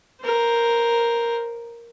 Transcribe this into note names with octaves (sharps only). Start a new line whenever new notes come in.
A#4 C5